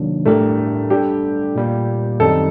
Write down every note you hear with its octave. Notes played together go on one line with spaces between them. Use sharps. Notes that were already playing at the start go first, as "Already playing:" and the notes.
Already playing: C3 D#3 F#3 A#3 D4
A2 G3 A3 D4 G4 A#4
G3 D4 G4 A4
A#2 G3 A#3
F#2 D#3 G3 C4 D#4 A4